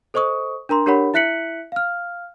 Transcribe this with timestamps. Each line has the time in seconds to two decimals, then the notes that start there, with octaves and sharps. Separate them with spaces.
0.14 A4 C5 D#5 C#6 D#6
0.69 D4 A#4 A#5 C6
0.86 D4 G4 A#4 C#5 F#5 B5
1.14 E4 E5 F#6 B6 C#7 F#7
1.72 F5 F6